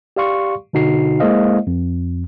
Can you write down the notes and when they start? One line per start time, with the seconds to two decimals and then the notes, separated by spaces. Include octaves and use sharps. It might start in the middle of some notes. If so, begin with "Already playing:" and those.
0.16 G4 D5 F5 C6 C#6
0.73 B2 D3 D#4 F#4 C7
1.20 G#3 A#3 E4 C5 D#5 F5
1.67 F2